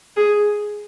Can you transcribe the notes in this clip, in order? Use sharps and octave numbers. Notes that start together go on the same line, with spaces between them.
G#4